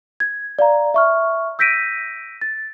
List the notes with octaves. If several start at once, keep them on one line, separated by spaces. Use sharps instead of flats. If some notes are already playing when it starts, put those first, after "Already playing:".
G#6
D5 F5 A#5
E5 C#6 F6
E6 G6 A#6 B6 D7 D#7
A6